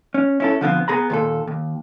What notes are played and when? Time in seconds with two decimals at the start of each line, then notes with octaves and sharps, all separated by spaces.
0.14 C#4
0.40 C#4 E4 A4
0.61 D3 F3 B3 C4
0.88 B3 G#4 A#5 B5
1.10 D#2 A#2 A4
1.47 D#2